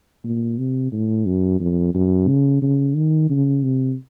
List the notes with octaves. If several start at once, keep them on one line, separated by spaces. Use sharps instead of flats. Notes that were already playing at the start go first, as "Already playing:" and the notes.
A#2
C3
A2
F#2
F2
F#2
C#3
C#3
D#3
C#3
C3